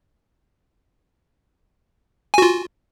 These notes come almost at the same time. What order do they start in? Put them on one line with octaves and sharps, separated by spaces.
G#5 F#4 F4